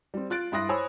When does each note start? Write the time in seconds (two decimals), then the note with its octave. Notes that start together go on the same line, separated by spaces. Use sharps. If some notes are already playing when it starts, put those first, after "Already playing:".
0.14 G3 C4
0.30 F4 F#6 A6 D7
0.52 G2 E4 C6 D#6 F#6 A#6
0.69 C5 C#5 G#5 B5 E6